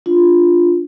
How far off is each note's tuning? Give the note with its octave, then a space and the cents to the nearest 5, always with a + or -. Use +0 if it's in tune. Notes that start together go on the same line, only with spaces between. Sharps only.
D4 +0 F4 +0